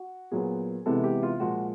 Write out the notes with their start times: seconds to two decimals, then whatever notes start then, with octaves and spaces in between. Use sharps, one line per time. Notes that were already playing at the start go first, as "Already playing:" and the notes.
Already playing: F#4
0.32 A#2 F#3 B3 G#4
0.86 C3 E3 G#3 B3 A4
1.04 G4
1.23 F4
1.40 A#2 F3 G#3 F#4